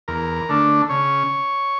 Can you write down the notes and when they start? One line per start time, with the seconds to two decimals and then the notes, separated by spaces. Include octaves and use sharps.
0.08 E2 A#4
0.49 D3 A3 D4
0.89 C#3 C#5